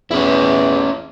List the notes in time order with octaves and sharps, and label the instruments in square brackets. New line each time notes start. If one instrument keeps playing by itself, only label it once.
[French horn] E2 [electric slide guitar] C#4 E4